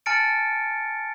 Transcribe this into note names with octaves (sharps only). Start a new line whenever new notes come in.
G#5 A5 F6 A6 C#7 D7